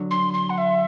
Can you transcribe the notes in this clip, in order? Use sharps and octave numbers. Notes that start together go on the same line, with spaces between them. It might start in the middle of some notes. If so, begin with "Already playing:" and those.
Already playing: D3 F#3
C6
C6
F#5
E5